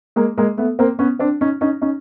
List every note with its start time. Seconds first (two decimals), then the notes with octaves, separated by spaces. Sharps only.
0.16 G#3 A#3
0.37 G#3 A#3
0.58 A3 B3
0.79 A#3 C4
0.99 B3 C#4
1.19 C4 D4
1.41 C#4 D#4
1.61 C#4 D#4
1.81 C#4 D#4